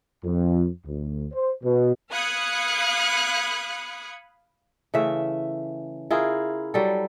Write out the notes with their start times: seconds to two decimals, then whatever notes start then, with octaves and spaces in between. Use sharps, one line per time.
0.24 F2
0.85 D2
1.33 C5
1.63 B2
2.11 F5 B5 D#6 F#6 G#6 C#7
4.94 C#3 E3 A3 E5
6.11 E4 F4 G#4 A#4
6.74 F#3 G3 A4